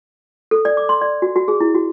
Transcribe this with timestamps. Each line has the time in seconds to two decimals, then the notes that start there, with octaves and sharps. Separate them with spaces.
0.51 A4
0.65 D5
0.77 D6
0.89 C6
1.02 D5
1.22 F#4
1.36 F#4
1.48 G#4
1.61 E4
1.75 F#4